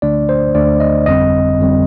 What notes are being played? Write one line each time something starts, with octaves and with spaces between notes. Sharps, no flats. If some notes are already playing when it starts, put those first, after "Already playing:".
D2 D3 A3 D4 D5
C5
D2 D3 A3 D4 D5
D#5
G1 F2 D3 G3 C4 D#5
G1 F2 D3 G3 C4